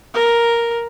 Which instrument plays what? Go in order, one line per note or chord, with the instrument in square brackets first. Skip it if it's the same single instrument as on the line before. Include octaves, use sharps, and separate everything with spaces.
[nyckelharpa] A#4